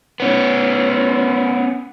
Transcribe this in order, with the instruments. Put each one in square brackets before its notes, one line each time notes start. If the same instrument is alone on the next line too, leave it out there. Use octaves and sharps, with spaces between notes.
[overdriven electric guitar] B3 C#4